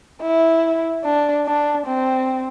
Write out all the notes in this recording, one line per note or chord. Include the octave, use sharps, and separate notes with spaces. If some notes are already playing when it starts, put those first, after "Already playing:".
E4
D4
D4
C4